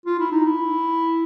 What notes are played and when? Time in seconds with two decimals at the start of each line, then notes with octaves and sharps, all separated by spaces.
0.06 F4
0.20 E4
0.32 D#4
0.45 E4